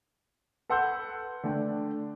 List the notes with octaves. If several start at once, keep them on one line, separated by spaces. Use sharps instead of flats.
A4 B4 F#5 C6 E6 G6
D3 A3 G5